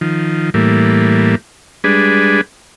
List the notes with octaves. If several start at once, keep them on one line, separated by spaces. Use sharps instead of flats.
D#3 F3
A2 E3 G3 A#3
G3 G#3 D4 G#4 B4